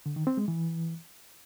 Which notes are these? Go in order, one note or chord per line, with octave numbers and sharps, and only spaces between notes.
D3
D#3
C4
G#3
E3